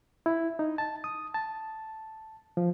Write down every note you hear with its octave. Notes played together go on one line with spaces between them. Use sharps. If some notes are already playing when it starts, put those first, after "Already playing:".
E4
D#4
A5
D#6
A5
F3